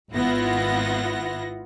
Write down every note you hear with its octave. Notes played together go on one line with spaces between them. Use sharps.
G#1 B3 E4 F4 F#5 A#6